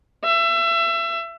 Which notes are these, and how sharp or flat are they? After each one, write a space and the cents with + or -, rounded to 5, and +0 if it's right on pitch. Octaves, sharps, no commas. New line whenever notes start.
E5 +30